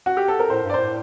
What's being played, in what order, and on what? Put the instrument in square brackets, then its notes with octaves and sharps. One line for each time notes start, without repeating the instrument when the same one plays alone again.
[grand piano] F#4
G4
A4
A#4
[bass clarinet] A2 [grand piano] C5
[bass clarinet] G2
[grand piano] D5
[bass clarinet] A2 [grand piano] C5